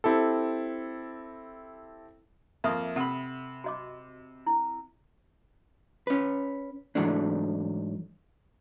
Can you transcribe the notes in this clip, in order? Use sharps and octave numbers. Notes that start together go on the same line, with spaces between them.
C4 E4 G4 A4
F2 A#3 E5 C#6 D#6
C3 A4 F#5 B5
F#4 D#5 D6
E4
C#4 B4
G#2 E3 F#3 A3 D4